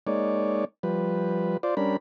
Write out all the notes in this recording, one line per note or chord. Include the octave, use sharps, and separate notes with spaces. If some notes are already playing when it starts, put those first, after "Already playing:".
G#3 A#3 D#4 C#5 D5
F3 G3 B4
F4 C5 D5
G3 C#4 D4 A#4 B5